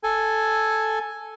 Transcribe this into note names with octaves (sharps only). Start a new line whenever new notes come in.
A4 G#5